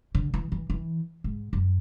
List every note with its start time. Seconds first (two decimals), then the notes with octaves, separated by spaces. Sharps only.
0.15 D3
0.34 E3
0.52 E3
0.70 E3
1.24 G#2
1.53 F#2